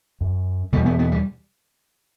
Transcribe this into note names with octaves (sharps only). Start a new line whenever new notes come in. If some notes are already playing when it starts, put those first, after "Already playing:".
F#2
E2 B2 G3
B3
B3
G3